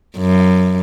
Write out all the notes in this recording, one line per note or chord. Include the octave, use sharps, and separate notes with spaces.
F#2